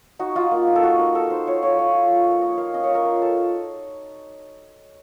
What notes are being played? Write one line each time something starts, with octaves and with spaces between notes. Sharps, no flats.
D#4 F#4
D#4 F4
A#3
D#4
A4
A#3 F#4
D#4 A#4
D#4 A4
D#4 C5
F4 C#5
F3 C#5
F4 C#5
F4
F3
A#3
A#3 D#5
A#3 F5
C#4 D#5
C#5
F4 A#4
F4 A#4
C#4 A4